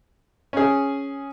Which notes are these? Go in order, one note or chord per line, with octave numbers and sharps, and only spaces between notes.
C#4 G#4